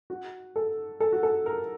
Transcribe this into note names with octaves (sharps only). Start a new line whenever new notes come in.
F#4
A4
A4
F#4
A4
A#4